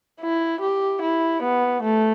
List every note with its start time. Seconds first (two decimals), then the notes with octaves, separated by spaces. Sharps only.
0.21 E4
0.61 G4
1.02 E4
1.43 B3
1.83 A3